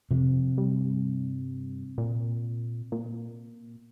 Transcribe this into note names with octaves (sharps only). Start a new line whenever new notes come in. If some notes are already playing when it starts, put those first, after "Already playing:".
F2 C3
G2
A#2
A#2